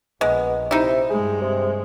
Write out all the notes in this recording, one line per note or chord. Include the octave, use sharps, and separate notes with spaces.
A#1 G#3 B3
C3 D#4 E4
G2 G#3 G#4
C3